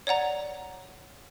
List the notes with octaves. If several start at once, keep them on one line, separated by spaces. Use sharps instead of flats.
C#5 D5 F#5 A#5